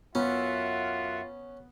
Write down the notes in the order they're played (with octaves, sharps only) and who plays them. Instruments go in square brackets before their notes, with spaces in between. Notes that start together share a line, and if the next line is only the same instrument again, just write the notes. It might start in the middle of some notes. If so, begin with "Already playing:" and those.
[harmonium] F#2 E5 F#5 [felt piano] B3 [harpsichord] C#4 [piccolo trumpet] F4